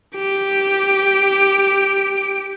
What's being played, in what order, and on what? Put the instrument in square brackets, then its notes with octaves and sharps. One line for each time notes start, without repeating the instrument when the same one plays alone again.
[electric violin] G4 D7